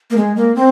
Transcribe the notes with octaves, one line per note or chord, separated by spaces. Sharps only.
A#3
G#3
A#3
C4